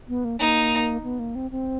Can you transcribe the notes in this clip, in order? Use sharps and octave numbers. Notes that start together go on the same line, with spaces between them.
B3
A#3
A#3 D#4
B3
A#3
C4
C4